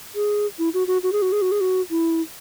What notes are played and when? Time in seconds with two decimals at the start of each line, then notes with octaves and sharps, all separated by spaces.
0.15 G#4
0.59 E4
0.74 F#4
0.87 F#4
1.03 F#4
1.12 G#4
1.22 F#4
1.32 G#4
1.42 F#4
1.52 G#4
1.61 F#4
1.91 E4